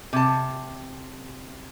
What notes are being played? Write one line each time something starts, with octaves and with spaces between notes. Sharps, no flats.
C3 A5